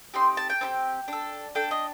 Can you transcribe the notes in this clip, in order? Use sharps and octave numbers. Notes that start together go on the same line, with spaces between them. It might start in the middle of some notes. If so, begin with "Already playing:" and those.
C4 D#4 G4 C6
A5
G5
C4 D#4 G4
D4 A4
D4 A4 G5
D#5